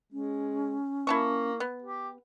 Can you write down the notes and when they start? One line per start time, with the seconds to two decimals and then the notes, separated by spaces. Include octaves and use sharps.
0.13 G#3 C#4
1.07 A#3 E4 A5 C#6
1.60 B3
1.82 G4